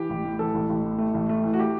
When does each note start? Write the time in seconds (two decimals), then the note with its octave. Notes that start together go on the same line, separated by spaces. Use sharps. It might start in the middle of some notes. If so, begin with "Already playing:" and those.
Already playing: E3 G4
0.10 A1
0.25 A2
0.39 E3 A4
0.55 A1
0.69 A1
0.84 A2
0.98 A3
1.14 A1
1.29 A3
1.44 E3
1.54 F#4
1.59 G4